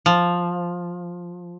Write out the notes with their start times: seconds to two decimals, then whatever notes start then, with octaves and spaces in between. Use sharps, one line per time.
0.06 F3